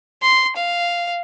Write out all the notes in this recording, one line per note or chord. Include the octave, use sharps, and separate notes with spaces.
C6
F5